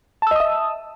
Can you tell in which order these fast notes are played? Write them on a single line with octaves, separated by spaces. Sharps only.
A5 E6 D#5 D#6 E5